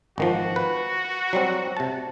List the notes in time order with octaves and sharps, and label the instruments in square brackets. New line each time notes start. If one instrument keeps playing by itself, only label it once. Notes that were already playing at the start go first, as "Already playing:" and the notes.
[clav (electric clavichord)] G#1 D#3 F3 [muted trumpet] F#4
[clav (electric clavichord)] B4
F#3 G3 C4
C3 A5